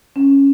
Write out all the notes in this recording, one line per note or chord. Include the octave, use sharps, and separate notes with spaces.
C#4